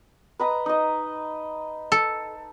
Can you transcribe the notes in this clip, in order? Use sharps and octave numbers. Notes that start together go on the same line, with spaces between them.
B4 D#5 A#5
D#4 D#5
A4